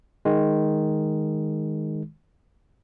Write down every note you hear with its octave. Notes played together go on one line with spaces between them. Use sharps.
D#3 G#3